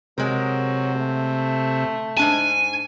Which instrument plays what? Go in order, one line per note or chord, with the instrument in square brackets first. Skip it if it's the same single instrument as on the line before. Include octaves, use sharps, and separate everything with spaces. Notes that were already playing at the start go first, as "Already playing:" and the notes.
[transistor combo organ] C3 [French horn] F#3 [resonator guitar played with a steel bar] G#3 A#4
[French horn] A3
[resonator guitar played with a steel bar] G#2 D4 A5 [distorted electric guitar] G#5